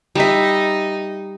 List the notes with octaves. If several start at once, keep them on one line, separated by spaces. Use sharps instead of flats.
G3 D#4 E5